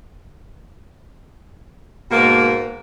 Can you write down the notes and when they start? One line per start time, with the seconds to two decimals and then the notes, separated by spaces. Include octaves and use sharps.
2.11 G#2 B2 A#3